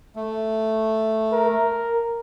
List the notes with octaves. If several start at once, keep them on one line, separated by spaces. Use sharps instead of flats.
A3
A#4